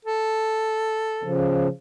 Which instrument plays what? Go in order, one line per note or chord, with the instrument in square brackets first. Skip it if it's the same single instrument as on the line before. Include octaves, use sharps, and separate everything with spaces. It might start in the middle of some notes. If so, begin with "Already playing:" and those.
[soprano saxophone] A4
[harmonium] C#3 F3